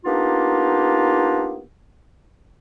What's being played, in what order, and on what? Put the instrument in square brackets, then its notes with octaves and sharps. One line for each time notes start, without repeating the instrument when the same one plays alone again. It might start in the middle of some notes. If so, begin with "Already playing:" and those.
[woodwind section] A#3 B3 D4 D#4 F4 G4